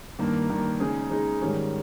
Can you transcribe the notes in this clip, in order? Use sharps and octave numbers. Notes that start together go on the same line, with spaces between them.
G2 D#3 A#3
G2 D#3 A#3
C#3 G#3 D#4 G#4
C#3 G#3 D#4 G#4
G#2 D#3 G3 C#4 G#4